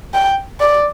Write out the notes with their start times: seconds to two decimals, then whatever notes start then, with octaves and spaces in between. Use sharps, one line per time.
0.14 G5
0.60 D5